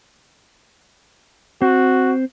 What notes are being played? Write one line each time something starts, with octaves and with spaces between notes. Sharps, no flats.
C4 F#4